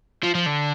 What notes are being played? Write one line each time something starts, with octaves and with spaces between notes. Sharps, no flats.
F3
F3
D3